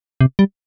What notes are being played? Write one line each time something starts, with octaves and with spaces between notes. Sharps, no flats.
C3
G3